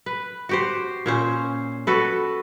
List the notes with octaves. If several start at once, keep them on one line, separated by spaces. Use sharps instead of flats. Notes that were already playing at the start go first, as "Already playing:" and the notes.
B4
F#4 G4 C5
A#2 C#4 C5
F#4 A4 B4